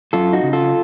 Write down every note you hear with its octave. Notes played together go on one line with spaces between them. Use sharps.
F#2 F4 A4
D#4 F#4
C#3
F4 A4